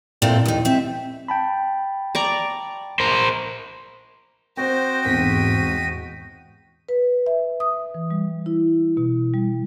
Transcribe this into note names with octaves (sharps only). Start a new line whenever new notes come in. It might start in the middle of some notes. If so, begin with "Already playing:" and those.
A#2 C4 E4 A4
D#2 D#4
C4 E5
G5 A5 B5
D5 A#5 C#6
A#4 C5
C4 F#4 C5 D#5 G5
B1 E2 G#2 C4 B6 D#7
B4
E5
D#6
E3
G3
E4
B2
G3